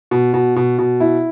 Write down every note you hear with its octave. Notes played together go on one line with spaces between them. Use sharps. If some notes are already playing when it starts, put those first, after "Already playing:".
B2
B2
B2
B2
E4